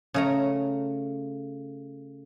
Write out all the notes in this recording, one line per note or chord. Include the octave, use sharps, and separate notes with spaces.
C#3 A3 A#5